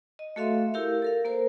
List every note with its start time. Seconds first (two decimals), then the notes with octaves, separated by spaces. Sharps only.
0.19 D#5
0.36 A3 F#4 A4 E5 F5 C6
0.74 E4 G4 A#4 F5
1.02 A4 A#4 F5
1.25 A#3 A#4 C5